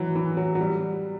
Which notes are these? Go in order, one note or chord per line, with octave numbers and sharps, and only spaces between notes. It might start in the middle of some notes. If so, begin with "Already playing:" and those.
Already playing: E3 F#3
E3
F#3
F#3
G3